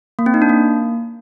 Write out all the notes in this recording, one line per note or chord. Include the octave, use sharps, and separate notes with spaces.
A#3
C4
D#4
D4
A#3